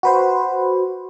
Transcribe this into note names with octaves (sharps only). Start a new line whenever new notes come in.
F#4 B4 C5